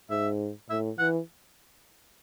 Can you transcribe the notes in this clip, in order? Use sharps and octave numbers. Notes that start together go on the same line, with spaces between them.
G#2 E5
A2 E5
E3 F#5